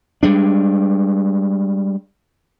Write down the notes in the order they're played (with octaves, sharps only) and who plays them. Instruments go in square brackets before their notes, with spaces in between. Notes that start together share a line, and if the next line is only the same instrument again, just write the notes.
[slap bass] G3 G#3 D4